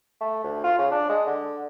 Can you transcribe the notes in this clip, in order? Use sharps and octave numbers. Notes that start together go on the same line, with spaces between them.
A3
D2
F4
C#3
D4
G#3
D3